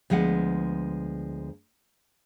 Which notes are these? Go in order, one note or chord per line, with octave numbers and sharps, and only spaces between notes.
D2 F3 G#3 B3 F#5